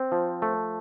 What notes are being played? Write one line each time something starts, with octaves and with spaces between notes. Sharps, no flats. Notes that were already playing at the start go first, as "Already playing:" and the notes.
Already playing: C4
F3
A3